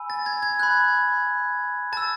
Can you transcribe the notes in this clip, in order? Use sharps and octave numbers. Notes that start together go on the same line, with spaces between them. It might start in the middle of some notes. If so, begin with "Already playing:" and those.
Already playing: G#5 B5 E6
A6
G#6
G#6
B5 F#6 G#6
A5 E6 A6